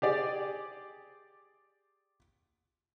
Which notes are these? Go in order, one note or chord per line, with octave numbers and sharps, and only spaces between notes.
G4 G#4 D5